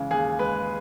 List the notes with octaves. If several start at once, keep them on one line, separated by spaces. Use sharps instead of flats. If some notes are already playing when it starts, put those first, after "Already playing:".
Already playing: C#3 E3 G#3
D#2 G#4
G#3 B4